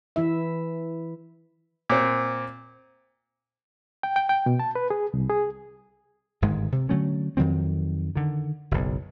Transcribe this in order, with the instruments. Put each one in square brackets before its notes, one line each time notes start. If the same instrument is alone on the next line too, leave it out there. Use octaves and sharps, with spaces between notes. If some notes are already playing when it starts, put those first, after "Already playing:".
[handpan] E3 E4 E5
[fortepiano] A#2 C4
[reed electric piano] G5
G5
G5
B2
A5
B4
G#4
C2
G#4
[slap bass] G1 G#2 D#3 G#3
C3
D3 F#3 A3 C#4
F2 D#3 F#3 C4
D3 D#3
F#1 B1